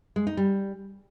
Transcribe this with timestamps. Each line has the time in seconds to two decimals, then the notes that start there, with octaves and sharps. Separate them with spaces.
0.16 G#3
0.27 D#4
0.37 G3